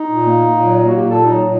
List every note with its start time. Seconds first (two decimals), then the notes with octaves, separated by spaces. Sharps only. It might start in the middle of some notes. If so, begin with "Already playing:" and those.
Already playing: D#4
0.09 A#2
0.23 A#3
0.38 A#3
0.51 A#2
0.66 F#3
0.81 A#3 F#4
0.95 A#2 G4
1.09 A#2 A4
1.24 F#3 D#4
1.38 A#2